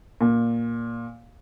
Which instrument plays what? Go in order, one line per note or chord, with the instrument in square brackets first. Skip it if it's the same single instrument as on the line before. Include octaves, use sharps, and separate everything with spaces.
[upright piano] A#2